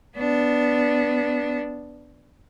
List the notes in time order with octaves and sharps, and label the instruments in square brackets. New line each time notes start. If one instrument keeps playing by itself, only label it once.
[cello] B3 D4